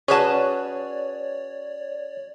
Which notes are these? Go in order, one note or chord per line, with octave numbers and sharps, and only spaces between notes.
C#4 F#4 G#4 B4 C#5 D5 A5